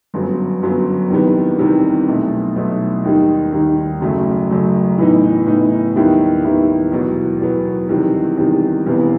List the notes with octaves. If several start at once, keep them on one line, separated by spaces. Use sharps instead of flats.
G1 F#2 F#3 B3
G1 F#2 F#3 B3
E2 C3 D#3 G3 B3
E2 C3 D#3 G3 B3
B1 B2 A3
B1 B2 A3
D#2 D#3 G3 D#4
D#2 D#3 G3 D#4
F#1 F#2 F#3 A3
F#1 F#2 F#3 A3
A2 E3 B3 D#4
A2 E3 B3 D#4
D#2 D#3 G3 B3 E4
D#2 D#3 G3 B3 E4
E2 B2 F#3 B3
E2 B2 F#3 B3
E2 C3 D#3 G3
E2 C3 D#3 G3
E1 E2 C3 E3 B3